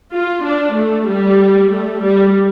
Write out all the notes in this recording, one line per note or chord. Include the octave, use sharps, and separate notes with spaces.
F4
D4
A3
G3
A3
G3